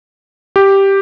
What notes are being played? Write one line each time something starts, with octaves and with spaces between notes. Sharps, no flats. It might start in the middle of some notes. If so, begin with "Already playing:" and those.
G4